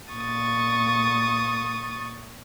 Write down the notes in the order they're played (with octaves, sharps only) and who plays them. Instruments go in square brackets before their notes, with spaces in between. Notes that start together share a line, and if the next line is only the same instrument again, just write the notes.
[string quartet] A#2 C#6 D#6 A6